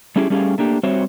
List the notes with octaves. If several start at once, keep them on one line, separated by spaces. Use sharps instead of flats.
G3 A3 C#4 E4 G4 G#4
G3 A3 C#4 G4 G#4 F5
A3 A#3 D4 G4
G3 C4 F#4 C5 C#5 E5